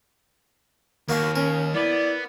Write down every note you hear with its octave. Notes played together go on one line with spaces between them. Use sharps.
D#2 A#3 F#4 F5
C#4 A#4
B3 E4 D5